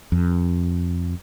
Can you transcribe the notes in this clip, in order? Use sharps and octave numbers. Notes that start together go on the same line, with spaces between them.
F2